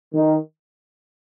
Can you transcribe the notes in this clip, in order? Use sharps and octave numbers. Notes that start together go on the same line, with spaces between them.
D#3